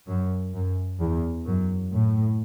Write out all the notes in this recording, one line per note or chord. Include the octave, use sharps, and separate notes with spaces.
F#2
F#2
E2
F#2
A2